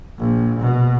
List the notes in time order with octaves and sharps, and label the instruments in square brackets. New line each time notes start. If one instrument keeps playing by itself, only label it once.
[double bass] A#1
B2